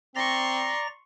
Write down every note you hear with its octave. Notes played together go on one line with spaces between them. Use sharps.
C4 D5 A#5 C6 C#6 A#6